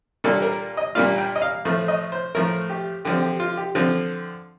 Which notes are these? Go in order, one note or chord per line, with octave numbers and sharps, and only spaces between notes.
A#2 G3 A#3 D4 F4 A4
A#4
D#5
A#2 G3 A#3 D4 F4 F5
G5
D#5
F5
A2 F3 A3
D#5
C5
A2 F3 A3 A#4
G4
D3 F3 C4 G4
G4
F4
G4
D3 F3 C4 F4